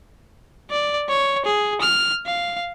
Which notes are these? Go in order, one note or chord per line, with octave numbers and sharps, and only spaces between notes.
D5
C#5
G#4
F6
F5